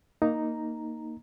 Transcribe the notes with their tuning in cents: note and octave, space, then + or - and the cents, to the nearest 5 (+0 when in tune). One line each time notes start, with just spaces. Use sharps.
A#3 -5 D#4 +0 A#5 +0